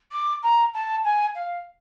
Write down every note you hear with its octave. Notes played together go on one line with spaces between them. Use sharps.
D6
A#5
A5
G#5
F5